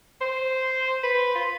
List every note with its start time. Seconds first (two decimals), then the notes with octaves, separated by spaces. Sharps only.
0.21 C5
1.03 B4
1.35 F4